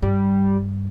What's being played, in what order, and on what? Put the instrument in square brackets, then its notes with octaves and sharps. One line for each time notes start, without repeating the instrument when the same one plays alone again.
[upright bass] G2 [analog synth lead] G3